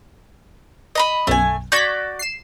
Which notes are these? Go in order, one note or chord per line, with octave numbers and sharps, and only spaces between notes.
D#5 A#5 B5
B1 F#2 A3 G#5
F#4 D5 C#6 G6 G#6 B6
C7 E7